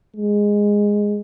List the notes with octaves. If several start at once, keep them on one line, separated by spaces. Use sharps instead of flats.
G#3